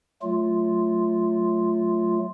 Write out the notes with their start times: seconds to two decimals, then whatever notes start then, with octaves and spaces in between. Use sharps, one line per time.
0.22 F#3 A3 F4